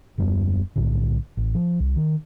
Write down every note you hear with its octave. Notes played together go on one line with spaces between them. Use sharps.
D#1 F#2 G3 B3
B1 A2 D3
A1
F3
C2
D#3